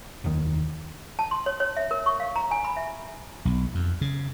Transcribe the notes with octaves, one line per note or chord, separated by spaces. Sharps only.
F1 D#2 D#3
A5
C6
C#5
C#5
E5
A#4
C#6
F5
A#5
G#5
B5
E5
B1
F2
C#3